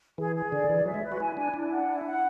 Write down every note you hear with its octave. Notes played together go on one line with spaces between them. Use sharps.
E3 G#4
G#4
D3 D5
E3 G#4
F#3 E5
G#3
B4
F#4
E4 G#5
D4 G#5
D4 E4
F#5
E4
F#5